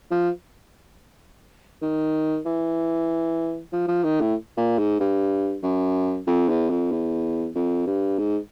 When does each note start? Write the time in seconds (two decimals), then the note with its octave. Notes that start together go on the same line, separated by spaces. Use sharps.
0.11 F3
1.82 D#3
2.45 E3
3.73 F3
3.88 F3
4.04 D#3
4.21 A2
4.57 A#2
4.78 G#2
5.00 G2
5.63 F#2
6.27 F2
6.49 E2
6.70 F2
6.92 E2
7.55 F2
7.87 G2
8.18 G#2